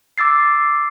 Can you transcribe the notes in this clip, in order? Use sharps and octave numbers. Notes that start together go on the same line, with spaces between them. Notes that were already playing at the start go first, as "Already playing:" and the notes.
D6 E6 A6 C7